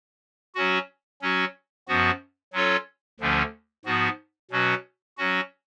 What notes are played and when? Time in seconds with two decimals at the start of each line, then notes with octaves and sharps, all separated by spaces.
0.55 F#3 C#4 F#4
1.22 F#3 C#4 F#4
1.88 F#2 F3 B3 F#4
2.53 F#3 C#4 F4 A4 C#5
3.20 D2 D3 F3 A3 C#4
3.85 G#2 F3 B3 F#4
4.51 B2 F#3 C#4 F#4 B4
5.18 F#3 C#4 F#4